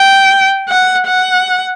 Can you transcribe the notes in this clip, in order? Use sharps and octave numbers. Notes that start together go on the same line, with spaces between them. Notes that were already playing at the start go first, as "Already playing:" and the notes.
Already playing: G5
F#5
F#5